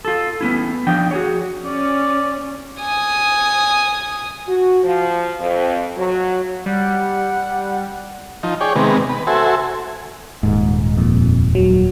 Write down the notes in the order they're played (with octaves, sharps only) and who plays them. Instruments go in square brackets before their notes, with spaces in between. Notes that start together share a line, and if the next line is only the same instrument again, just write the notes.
[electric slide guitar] F4 A4
B3 C#4 E4
F3 D4 G5
F#4 G#4 C#5
[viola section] C#4 [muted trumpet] D5
[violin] G#5 D#6
[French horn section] F#4
F3
F2
F#3
[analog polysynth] G3 [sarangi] F#5
[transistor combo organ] F3 D#4
G#4 C#5 D5 G5
C3 D#3 G#3 B3
B4
F#4 A4 C5 E5 G#5
[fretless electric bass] D#1 G#2
[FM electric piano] F2 A#2
F#3